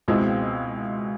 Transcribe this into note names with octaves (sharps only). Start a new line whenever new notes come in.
C#2 B2 G#3 C4 E4